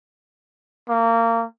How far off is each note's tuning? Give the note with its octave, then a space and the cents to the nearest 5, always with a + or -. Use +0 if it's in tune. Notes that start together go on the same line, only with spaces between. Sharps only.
A#3 -25